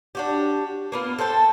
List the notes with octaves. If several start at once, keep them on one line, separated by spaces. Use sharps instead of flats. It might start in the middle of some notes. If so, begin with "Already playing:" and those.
D4 F#4 G4
A#3 B3 F4
A4 C5 G5 A5